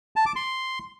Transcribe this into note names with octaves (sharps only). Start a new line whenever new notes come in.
A5
D6
C6